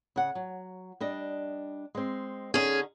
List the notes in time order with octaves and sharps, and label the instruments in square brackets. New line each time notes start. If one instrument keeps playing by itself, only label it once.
[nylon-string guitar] C#3 F#5
F#3
G3 D4 D#5
G#3 C4
[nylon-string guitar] D3 D#4 [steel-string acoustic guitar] C#4 G#4